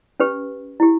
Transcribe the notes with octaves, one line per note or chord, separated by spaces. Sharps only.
C#4 G4 B4
E4 G4